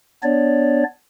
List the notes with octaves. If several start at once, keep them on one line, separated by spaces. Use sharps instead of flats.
B3 D4 C#5 D5